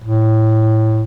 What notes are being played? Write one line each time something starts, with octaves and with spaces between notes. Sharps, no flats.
A2